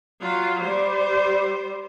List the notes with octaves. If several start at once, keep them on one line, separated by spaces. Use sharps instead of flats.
F#3 F4
G3 C5